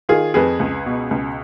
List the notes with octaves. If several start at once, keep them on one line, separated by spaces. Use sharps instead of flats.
D#3 F4 G#4
F2 G#4 B4
C#2
B2
C#2